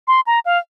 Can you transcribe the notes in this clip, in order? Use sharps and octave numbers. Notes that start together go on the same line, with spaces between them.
C6
A#5
F5